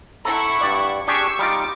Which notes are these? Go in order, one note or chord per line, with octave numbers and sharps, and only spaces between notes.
E4 A4 F#5 A#5 C#6
G2 D5
D4 G4 G#4 C#6 E6 G#6
G3 D#4 F4 D6